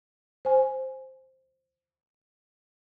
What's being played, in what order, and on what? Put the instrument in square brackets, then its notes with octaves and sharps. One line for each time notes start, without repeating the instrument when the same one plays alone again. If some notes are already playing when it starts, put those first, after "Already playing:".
[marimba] C5 G#5